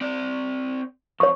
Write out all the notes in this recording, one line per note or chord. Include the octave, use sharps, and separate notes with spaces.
C4 D5
F2 C#5 C#6